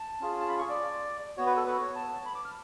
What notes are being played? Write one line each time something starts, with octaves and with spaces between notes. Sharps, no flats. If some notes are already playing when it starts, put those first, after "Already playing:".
Already playing: A5
C#4 F4 G#4
A5
B5
C#6
D5
B3 F#4 C#5
B4
A4
B4
C#5
A5
B5
D6
F6